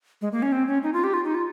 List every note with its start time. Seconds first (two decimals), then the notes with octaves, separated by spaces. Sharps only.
0.22 G#3
0.32 A#3
0.42 C#4
0.52 C4
0.67 C#4
0.83 D#4
0.94 F4
1.04 G4
1.14 F4
1.25 D#4
1.35 F4